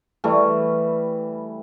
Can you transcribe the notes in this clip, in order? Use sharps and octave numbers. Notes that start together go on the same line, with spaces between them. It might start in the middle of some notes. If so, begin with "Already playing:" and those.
E3 G3 A3